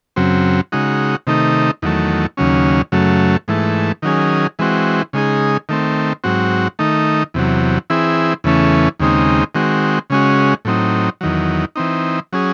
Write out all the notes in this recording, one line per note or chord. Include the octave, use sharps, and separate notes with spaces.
F#2 C#3 F#3 C4
C#3 G#3 D#4 F#4
C3 D#3 A3 D#4
E2 D#3 F#3 A3
D#2 C#3 F#3 C#4
F#2 C#3 F#3 A3
G#2 E3 A3
D#3 F#3 C#4 G#4
E3 G#3 C4 F#4
C#3 G#3 D#4 G#4
D#3 A3 C4
G#2 F#3 C4 F#4
D#3 A3 D#4
E2 C3 F#3
E3 C4 E4 G#4
E2 C#3 E3 A3 C#4
D#2 C#3 G#3 C4 D#4
D#3 G#3 C4 F#4
C#3 G#3 C#4 F#4
A2 F#3 C4 D#4
E2 D#3 F#3
E3 C4 D#4
F#3 C#4 G#4